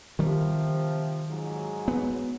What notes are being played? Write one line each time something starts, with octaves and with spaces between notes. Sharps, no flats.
C3 D#3 F3 G3
G#2 F#3
B3